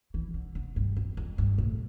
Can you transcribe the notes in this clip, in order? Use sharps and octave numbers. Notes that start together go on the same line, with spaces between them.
E3
D3
D3
G2
F2
F2
G2
A2